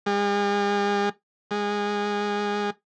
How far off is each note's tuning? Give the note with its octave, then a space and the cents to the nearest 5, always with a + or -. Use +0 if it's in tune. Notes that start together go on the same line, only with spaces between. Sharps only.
G#3 -45
G#3 -20